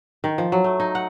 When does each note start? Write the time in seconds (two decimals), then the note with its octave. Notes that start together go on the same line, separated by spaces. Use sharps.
0.24 D#3
0.38 F3
0.52 F#3
0.64 A3
0.80 D#4
0.95 F#5